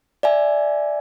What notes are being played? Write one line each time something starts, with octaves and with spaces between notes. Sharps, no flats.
D5 E5 G#5